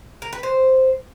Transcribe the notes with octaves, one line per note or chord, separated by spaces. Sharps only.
A#4
B4
C5